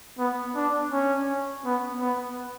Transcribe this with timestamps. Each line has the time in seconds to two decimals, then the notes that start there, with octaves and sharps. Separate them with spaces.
0.19 B3
0.56 D4
0.92 C#4
1.65 B3
2.01 B3